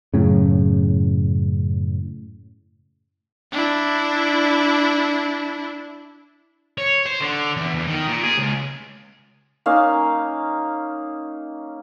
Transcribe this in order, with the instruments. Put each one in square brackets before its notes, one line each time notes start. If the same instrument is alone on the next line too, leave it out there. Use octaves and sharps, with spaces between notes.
[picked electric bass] F#2 A2 C#3
[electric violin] D4 E4
[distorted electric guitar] C#5
C5
D3
E2
E2
D#3
A#2
G#4
C#2
[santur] A#3 C#4 D#4 F5